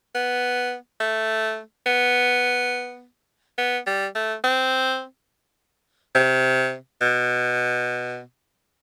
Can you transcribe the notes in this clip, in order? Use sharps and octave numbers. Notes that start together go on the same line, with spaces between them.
B3
A3
B3
B3
G3
A3
C4
C3
B2